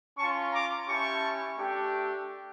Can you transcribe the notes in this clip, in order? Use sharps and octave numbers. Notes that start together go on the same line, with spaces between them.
C#4 F4 A5 C#6
A#5 D6
C#4 E4 G4 A5 C#6
A3 D4 G4